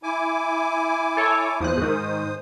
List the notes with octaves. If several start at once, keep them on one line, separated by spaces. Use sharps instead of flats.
E4 G#5 D6
A4 C#5
E2 F3 G#3 C5 D#6 F#6
G#2 D#3